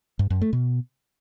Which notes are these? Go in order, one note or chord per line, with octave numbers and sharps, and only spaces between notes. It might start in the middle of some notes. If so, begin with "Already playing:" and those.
G2
F#2
A3
B2